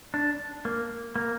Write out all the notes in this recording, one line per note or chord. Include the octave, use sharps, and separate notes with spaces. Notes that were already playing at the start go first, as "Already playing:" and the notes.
D4
A#3
A#3